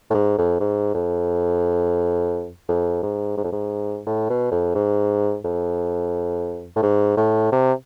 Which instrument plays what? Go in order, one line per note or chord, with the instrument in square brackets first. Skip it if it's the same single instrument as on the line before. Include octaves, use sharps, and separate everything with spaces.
[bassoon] A2
G#2
F2
G#2
F2
F2
G#2
G#2
F2
G#2
A2
B2
F2
G#2
F2
A2
G#2
A2
C3